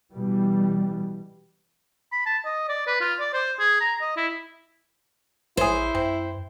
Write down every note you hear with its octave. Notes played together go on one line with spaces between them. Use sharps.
B2 E3 G3
B5
A5
D#5
D5
B4
F4
D5
C5
G#4
A#5
D#5
E4
A1 E4 G#4 C5 C#5
F#2 C4